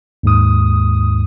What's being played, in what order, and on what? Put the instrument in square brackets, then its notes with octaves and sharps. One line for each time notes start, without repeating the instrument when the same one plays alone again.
[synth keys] D#2 G#2 D#6